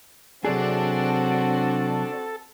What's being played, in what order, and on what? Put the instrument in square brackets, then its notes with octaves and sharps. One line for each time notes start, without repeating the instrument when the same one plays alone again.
[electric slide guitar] C3 F#3 G#4 [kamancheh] C4 F#4 [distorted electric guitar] D4 D5 [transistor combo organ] A4